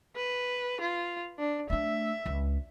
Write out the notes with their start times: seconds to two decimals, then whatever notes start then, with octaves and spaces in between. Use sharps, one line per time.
0.16 B4
0.81 F4
1.39 D4
1.70 A3 D4 E5
2.26 C#2